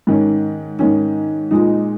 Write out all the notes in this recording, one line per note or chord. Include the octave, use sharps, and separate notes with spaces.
G#2 D#3 C#4
G#2 D#3 C#4
A#2 G#3 D#4